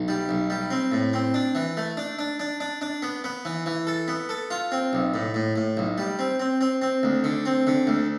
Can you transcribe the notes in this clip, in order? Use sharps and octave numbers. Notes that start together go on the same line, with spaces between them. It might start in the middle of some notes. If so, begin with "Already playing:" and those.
Already playing: B1
G3
B1
G3
C4
A2
C4
D4
E3
A3
D4
D4
D4
D4
D4
B3
B3
E3
E3
A4
B3
A4
F4
C4
B1
A2
A2
A2
B1
G3
C4
C4
C4
C4
D2
D3
C4
D3
D2